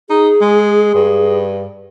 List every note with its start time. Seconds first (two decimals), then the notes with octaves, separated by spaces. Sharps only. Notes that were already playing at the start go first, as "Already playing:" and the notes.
0.10 D#4 G#4
0.41 G#3
0.94 G2